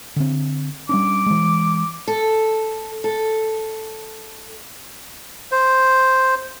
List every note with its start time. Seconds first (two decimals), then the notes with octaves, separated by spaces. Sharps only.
0.16 D3 C4
0.89 G3 C#4 D4 D6
1.26 E3 G#3
2.08 A4
3.04 A4
5.51 C5